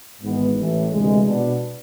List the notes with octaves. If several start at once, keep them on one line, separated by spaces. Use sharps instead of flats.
G#1 G#2 E3 G#3 B3
A1 A2 E3
D2 C3 E3 G#3
B2 B3 D4